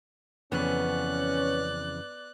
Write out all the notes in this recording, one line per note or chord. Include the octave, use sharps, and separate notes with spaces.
F2 C#3 E3 B3 C#4 D5 F#6